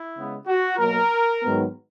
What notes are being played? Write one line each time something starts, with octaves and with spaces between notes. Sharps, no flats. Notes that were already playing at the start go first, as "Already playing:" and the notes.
Already playing: E4
C#3 G#3 B3
F#4
B2 F#3 A#3 A#4
G#2 D#3 F#3 B3